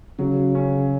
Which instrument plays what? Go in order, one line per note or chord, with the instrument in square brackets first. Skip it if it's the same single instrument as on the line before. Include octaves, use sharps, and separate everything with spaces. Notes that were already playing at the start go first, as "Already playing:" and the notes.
[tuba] C#3 [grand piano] F#3
[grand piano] C#4